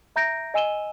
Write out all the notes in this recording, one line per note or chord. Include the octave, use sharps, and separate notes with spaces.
E5 A#5 G6 A#6 D7
D#5 G#5 E6 D#7 E7 G7